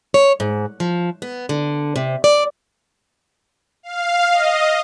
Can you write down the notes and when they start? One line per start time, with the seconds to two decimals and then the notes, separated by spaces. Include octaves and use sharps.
0.14 C#5
0.40 G#2
0.80 F3
1.22 B3
1.49 D3
1.96 C3
2.24 D5
3.83 F5
4.32 D#5